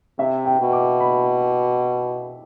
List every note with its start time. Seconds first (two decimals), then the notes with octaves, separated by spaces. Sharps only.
0.19 C3 E5
0.45 G5
0.59 B2
0.73 D6
1.00 B5